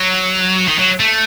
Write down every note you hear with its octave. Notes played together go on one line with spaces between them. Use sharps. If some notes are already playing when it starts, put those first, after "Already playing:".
Already playing: F#3
D#3
F#3
A3